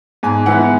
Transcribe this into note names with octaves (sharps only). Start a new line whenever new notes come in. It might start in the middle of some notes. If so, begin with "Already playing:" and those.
G#2 G#5
E3 G#3 B3 E4 F#5